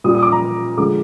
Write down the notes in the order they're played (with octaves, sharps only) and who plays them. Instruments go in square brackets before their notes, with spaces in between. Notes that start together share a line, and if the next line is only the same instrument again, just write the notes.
[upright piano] A#2 G3 D#6
D#6
D6
A#5
D3 F3 G#3 D6